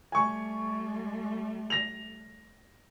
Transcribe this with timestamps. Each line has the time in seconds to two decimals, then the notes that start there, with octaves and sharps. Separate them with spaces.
0.12 G3 A3 G#5 C#6
1.70 A#6 F7